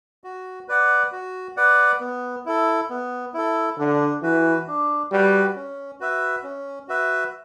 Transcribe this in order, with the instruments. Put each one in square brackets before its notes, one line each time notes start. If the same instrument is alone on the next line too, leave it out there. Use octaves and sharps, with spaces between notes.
[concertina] F#4
B4 D5 F#5
F#4
B4 D5 F#5
B3
E4 A4
B3
E4 A4
[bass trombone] D3 [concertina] D4
[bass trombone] E3 [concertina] F#4 B4
[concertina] D4
[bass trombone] G3 [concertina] F#4 B4
[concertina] C#4
F#4 B4 E5
C#4
F#4 B4 E5